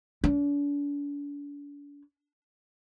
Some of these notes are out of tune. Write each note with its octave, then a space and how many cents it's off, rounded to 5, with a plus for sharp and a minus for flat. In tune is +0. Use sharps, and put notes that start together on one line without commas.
D4 -40